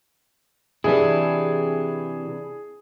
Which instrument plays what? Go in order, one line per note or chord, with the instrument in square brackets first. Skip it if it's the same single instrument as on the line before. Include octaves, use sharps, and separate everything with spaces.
[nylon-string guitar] C3 E3 [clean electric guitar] C4 D4 E4 [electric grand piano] G#4